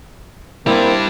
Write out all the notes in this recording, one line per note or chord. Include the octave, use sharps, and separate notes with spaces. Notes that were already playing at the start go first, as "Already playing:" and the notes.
G3 A#3 C4 D4 E4